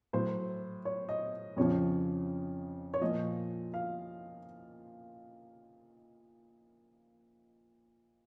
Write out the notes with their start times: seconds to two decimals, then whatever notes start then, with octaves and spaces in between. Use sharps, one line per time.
0.13 A2 F#3 C5
0.85 C#5
1.09 D#5
1.57 F2 C#3 F3 C#5
2.94 C#5
3.01 A#2 F3 D#5
3.74 F5